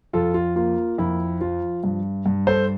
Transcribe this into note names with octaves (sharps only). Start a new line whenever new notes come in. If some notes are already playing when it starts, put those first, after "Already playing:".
F2 F4 A4
F4
A#3 F4
F2 E4
F3 F4
G2
G2
A4 C5